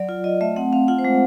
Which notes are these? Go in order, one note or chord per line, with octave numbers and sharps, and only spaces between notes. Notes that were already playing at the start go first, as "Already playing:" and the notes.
Already playing: F#3 D5
F4
F4 D#5
A3 E5
C4 F#5
C4 F5
F4 F#5
C5
G#3